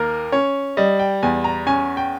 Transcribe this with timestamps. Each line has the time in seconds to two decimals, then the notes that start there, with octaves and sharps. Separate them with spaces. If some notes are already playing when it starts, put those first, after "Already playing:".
Already playing: D#2 A#3 A#4
0.32 C#4 C#5
0.77 G3 D#5
0.99 G5
1.23 E2 G#5
1.44 A#5
1.67 C#4 G#5
1.97 G5